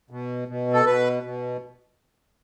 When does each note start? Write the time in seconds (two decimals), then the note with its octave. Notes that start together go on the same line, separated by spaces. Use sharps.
0.11 B2
0.48 B2
0.73 A4
0.86 B2 B4
1.23 B2